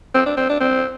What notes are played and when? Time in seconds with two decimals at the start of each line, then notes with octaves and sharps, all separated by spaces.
0.14 C4
0.26 D4
0.37 C4
0.49 D4
0.60 C4